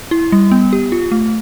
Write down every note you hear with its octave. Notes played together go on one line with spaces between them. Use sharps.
E4
G3
B3
G4
F4
A3